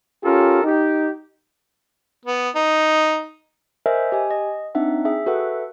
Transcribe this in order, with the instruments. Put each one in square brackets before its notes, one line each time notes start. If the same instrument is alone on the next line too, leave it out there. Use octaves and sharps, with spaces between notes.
[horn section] C#4 F4 G4 A4 A#4
D#4 G4
[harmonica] B3
D#4
[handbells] A#4 C5 D#5 E5 G#5
G4 D#5 G#5
D#5
C4 D4 D#4 E5 F#5
G#4 E5 G5
F#4 A4 B4 E5 F#5